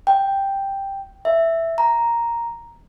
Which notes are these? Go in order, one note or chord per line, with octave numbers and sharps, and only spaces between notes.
G5
E5
A#5